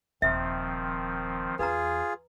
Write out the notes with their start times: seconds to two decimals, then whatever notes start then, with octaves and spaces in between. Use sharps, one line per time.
0.22 D#1 D#3 F3 C4 E5
1.59 E2 F4 G#4 B4 A#5